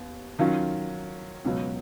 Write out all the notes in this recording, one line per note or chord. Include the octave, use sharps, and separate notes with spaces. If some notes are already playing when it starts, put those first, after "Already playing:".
Already playing: D#2 B3
D#3 F#3 C#4 F4
C#2 B2 F#3